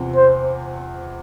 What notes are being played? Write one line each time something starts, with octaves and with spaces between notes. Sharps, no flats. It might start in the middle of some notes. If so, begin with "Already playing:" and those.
Already playing: E2 C3 F3 C4 F4
C5